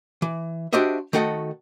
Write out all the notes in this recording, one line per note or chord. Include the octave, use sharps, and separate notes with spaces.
E3
D4 F#4 G4 C5 D#5 E5
D#3 A3 F#4 A4 D#5